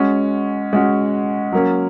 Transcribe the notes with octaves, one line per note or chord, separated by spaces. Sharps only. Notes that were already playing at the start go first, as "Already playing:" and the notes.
Already playing: G#3 C#4 F#4
G#3 C#4 F#4
F#3 A#3 C#4